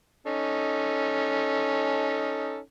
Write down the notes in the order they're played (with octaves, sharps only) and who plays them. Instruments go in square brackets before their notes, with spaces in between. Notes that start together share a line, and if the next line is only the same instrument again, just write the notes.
[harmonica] C#4 D#4 A4